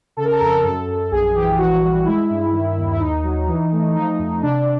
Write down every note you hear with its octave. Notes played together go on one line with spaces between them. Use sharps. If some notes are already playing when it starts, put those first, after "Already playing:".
C#3 A4
A#4
A4
F2 A#4
A4
F#2 A4
F#2
A#1 G#4
E3 G4
E3 F#4
G3
G#3 E4
G2
D#3
D#2
E4
D#2 D#4
F#3
E3
A3
F3 D#4
F2
C3 D4